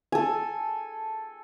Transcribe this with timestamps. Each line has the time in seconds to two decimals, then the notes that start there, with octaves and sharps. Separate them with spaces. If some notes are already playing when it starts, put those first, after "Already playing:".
0.12 A4 G#5